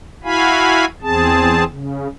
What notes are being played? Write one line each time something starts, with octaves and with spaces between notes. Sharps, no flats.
E4 F#4 F5 G#5 B5
E2 C4 G#4 A5
C#3